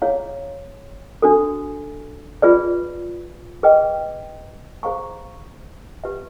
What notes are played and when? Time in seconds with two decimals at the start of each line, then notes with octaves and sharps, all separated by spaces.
0.02 E4 G#4 C#5 F5
1.22 D4 F#4 A4
2.42 F4 G#4 B4 D5
3.63 G#4 B4 D#5 G5
4.83 G#4 C5 F5 A#5 C#6
6.04 G4 B4 E5